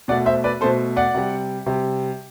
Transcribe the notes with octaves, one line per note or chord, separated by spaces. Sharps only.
B2 A3 D5 F#5
C5 E5
B4 D5
B2 A3 A4 C5
D5 F#5
C3 G3
C3 G3